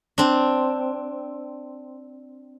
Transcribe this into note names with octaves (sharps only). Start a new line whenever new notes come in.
C4 D4